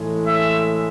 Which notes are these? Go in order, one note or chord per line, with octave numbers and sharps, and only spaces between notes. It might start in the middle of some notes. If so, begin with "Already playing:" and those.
Already playing: A2 E3 G#3
E5